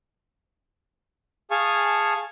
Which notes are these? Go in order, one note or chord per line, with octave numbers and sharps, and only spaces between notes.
G#4 F5 G#5 A5 C#6